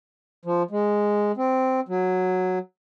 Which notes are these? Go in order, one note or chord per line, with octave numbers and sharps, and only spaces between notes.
F3
G#3
C4
F#3